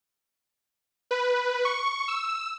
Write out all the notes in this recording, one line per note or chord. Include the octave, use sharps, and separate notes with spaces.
B4
C#6
E6